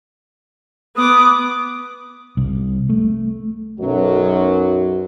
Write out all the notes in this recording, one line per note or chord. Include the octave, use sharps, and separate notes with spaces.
B3 D6 D#6
C2
A3
B1 F#2 F#3